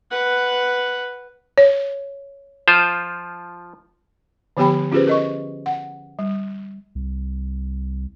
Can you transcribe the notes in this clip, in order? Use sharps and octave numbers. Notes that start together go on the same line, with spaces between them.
B4 F#5
C#5
F3 F4 C5
D3 F3 B3 G4 G5 B5
C#4 F4 G4 G#4 B4 C5
A#4 D#5 C#6
F#5
G3
C2